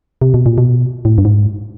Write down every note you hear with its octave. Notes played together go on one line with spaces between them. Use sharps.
C3
B2
A#2
B2
A2
G2
G#2